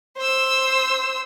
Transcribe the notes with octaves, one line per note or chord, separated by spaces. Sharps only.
C5 E6